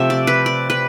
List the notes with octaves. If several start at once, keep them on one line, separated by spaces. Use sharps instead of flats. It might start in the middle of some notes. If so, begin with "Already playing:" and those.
Already playing: C3 F3 A3 E5
D5
B4
D5
B4